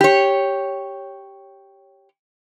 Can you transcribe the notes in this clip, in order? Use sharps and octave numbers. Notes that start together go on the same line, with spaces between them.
G4 C#5